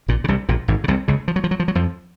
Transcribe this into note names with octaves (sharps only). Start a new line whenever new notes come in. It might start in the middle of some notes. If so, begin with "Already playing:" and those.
A#1 A#2
C#3
C2 C3
A#1 A#2
G#1 G#2
C#3
C2 C3
C#2 C#3
F3
F#3
F3
F#3
F3
F#3
F2 F3